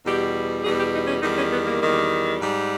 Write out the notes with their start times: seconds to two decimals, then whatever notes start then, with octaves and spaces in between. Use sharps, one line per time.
0.05 E2 B2 G3 G4
0.64 E2 B2 G3 G#4
0.78 G4
0.93 D#4
1.08 C#4
1.22 E2 D#3 G3 D#4
1.37 C#4
1.51 B3
1.66 A#3
1.81 E2 D#3 G3
2.39 G#2 G3